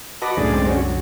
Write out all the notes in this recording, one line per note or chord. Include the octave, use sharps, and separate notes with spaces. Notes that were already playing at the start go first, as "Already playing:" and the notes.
F#4 B4 D#5 A5 D6
C2 F#2 A2 D3 G#4 D5
G#3 C4 D5
C#4 F#4
F#3